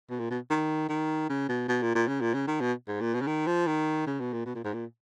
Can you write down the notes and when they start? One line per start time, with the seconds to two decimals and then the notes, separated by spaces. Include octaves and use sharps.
0.10 B2
0.19 A#2
0.30 B2
0.50 D#3
0.89 D#3
1.29 C#3
1.48 B2
1.68 B2
1.82 A#2
1.95 A#2
2.07 C#3
2.21 A#2
2.34 C#3
2.47 D#3
2.60 B2
2.88 G#2
3.01 A#2
3.14 B2
3.21 C#3
3.27 D#3
3.47 F3
3.66 D#3
4.06 C#3
4.20 B2
4.33 A#2
4.46 B2
4.55 A#2
4.64 G#2
4.73 A#2